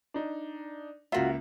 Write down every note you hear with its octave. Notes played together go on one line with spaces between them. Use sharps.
D4 D#4
C#2 A#3 F4 F#4 E5